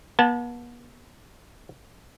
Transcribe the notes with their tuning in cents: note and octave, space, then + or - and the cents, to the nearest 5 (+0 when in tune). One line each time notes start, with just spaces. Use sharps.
B3 -45 F#5 -40 A5 +0